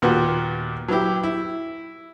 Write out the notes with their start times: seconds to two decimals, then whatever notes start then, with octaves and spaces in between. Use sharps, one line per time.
0.02 D#2 A#2 B3 F#4 G4
0.88 F#3 B3 E4 G4
1.23 E4